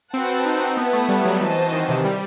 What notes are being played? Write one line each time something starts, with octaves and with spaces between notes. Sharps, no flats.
C4 F#4 B4 F#5 A5
C4
D#4
C4
B3 E4 B4 F#5 A5
A3
G3
F#3
E3 C4 F#4 C5 D#5 A5
D#3
C3
G3